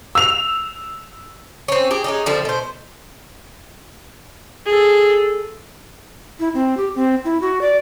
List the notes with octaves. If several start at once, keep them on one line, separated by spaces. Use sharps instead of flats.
E6 F7
C4 C#4
G4 G#4
G#3 C#4 D#4
D3 F3 G3 C4
B2 C5
G#4 A4
E4
C4
G4
C4
E4
F#4
D5